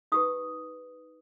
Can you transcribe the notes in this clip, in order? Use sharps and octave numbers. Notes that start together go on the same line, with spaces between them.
D#4 G4 B4 D#6